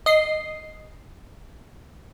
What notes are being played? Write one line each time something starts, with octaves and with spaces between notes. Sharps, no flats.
D#5 C7